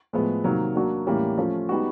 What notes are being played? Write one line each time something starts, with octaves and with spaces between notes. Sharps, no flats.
A2 F3 G#3 B3
C3 D#3 F#3 A#3
F#3 A#3 D4 F#4
A2 E3 G3 A#3 C#4
F3 A3 C#4 F4
G3 B3 D#4 F#4